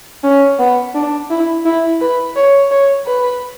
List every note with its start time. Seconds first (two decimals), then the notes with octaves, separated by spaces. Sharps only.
0.23 C#4
0.59 B3
0.94 D4
1.30 E4
1.65 E4
2.00 B4
2.36 C#5
2.71 C#5
3.06 B4